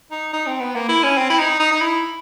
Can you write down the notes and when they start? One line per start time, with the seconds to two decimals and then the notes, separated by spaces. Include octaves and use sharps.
0.11 D#4
0.33 D#4
0.46 C4
0.60 B3
0.75 A#3
0.88 E4
1.03 C#4
1.17 C4
1.30 E4
1.39 D#4
1.59 D#4
1.72 D#4
1.81 E4